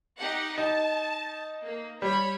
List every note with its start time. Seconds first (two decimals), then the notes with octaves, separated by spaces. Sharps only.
0.18 D#4 G4 F#5
0.58 D#4 A5
1.63 A#3
2.02 G3 C#5 B5